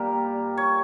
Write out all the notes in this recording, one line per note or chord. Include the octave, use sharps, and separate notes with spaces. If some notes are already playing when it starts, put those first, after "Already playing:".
Already playing: A#2 G3 G4 A#4
C#5